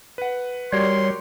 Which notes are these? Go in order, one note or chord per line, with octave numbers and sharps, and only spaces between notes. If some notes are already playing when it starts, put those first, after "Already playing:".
B4 F#5
G3 F#4 G4 A#4 C#5 C6